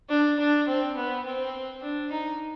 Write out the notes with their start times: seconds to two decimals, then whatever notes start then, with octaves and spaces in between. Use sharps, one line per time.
0.10 D4
0.39 D4
0.68 C4
0.96 B3
1.26 C4
1.83 D4
2.12 D#4